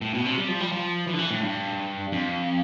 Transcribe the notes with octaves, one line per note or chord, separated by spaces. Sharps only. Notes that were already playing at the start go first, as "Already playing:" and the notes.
A2
B2
C3
G3
F3
G3
F3
E3
D3
E3
A2
G2
F2